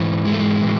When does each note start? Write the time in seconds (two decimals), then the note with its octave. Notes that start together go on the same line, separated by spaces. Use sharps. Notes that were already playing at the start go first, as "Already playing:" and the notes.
Already playing: G#2 E3
0.25 G#3
0.32 A3
0.40 G#3
0.61 A2 E3